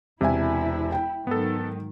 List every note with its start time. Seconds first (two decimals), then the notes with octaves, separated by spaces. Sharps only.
0.21 E1 C3 E4 E5 G#5
0.92 G5
1.27 G#2 D#3 F#3 B3 A4